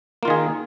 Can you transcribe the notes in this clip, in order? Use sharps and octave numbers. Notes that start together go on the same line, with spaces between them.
D#3 A#3 F4 G#4